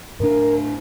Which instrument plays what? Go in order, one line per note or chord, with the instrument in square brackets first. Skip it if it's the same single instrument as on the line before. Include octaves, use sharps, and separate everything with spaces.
[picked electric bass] A2 D4 [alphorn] A#4